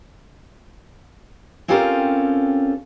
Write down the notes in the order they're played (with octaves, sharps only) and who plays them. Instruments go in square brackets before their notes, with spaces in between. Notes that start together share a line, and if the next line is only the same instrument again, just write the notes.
[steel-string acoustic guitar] C4 C#4 F4 G4 A4 A#4